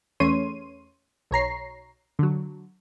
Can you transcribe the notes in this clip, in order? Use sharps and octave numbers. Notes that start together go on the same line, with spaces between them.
E2 A3 C#4 C#5 C6 D#7
B1 C#5 A#5 C7
D3 F#3